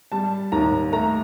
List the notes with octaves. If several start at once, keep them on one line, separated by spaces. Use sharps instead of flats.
G3 A5
D#2 A#5
A3 A#5